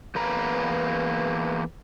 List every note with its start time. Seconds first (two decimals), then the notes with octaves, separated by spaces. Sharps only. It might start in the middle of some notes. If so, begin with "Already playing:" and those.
0.15 E2 A#3 B4 A#5